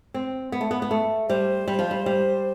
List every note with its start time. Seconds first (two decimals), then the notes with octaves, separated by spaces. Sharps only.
0.14 C4
0.52 B3
0.61 A3
0.71 B3
0.82 B3
0.91 A3
1.29 G3 C5
1.68 G3
1.79 F3
1.91 G3
2.06 G3